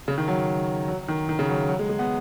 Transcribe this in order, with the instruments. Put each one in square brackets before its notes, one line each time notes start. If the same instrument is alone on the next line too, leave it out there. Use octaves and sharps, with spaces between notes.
[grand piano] C#3
D#3
F#3
F#3
D#3
D#3
C#3
F#3
F#3
G#3
G#3
B3